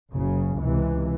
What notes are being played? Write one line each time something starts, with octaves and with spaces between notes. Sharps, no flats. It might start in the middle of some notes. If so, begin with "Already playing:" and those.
F#1 F#2 C#3
C#2 C3 E3